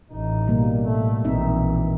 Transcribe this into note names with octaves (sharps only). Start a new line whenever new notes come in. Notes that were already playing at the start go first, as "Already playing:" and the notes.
A1 D#4
B2 G3 A#3
A2 A3
A#1 E3 C4 D#4 E5